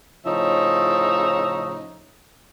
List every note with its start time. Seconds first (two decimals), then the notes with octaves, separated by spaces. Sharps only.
0.26 A2 C#3 F3 D#4 C#5 E5